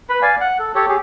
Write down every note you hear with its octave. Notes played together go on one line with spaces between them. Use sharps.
B4 B5
D5 F5 G#5
F#5
A4
G4 A4 C#5
G4 G#4